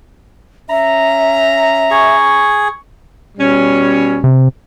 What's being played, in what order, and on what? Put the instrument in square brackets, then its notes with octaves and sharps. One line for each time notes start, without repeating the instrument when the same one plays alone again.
[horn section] C#4 A#5 [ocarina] E5
[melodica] G#4 [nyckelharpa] C#6
[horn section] B2 G3 C#4
[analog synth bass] C3